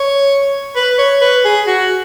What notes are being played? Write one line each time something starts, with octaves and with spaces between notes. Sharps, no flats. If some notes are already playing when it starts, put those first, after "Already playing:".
Already playing: C#5
B4
C#5
B4
G#4
F#4